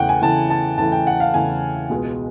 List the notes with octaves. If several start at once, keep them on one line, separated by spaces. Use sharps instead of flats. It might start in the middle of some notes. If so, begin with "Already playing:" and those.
Already playing: E2 C#3 E3 A3 F#5 G5
G#5
E2 C#3 E3 A3 A5
A5
E2 C#3 E3 A3 A5
G5
F#5
F5
E2 C#3 E3 A3 G#5
C#2 B2 G#3